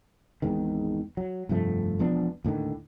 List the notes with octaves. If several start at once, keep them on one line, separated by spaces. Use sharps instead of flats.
G#1 E2 G#2 D#3
F#3
F1 G2 F3 A3
E1 F3 B3 D4
D#2 A2 D3 D#3